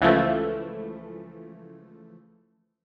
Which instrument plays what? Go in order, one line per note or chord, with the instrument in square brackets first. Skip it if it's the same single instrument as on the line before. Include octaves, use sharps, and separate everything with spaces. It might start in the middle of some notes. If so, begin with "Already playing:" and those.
[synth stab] C#2 E3 F3 A3